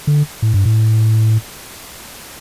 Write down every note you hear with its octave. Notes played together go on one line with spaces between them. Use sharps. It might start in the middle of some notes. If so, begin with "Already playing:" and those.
D3
A2
G2
A2